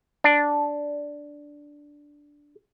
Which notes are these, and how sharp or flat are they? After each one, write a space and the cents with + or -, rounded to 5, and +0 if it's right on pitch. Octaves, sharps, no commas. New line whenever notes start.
D4 -5